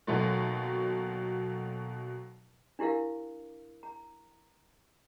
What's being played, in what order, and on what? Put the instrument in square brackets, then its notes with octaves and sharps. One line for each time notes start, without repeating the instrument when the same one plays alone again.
[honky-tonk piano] D#2 B2 F#3 A3
[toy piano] D4 E4 G4 A#4 F5
A#5